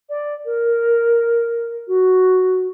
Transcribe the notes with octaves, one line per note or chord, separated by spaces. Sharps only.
D5
A#4
F#4